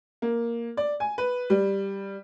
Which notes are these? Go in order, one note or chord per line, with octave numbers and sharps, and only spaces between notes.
A#3
D5
G#5
B4
G3